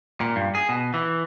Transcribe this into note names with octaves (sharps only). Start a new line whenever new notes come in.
A#2
G2
G#4
B2
E3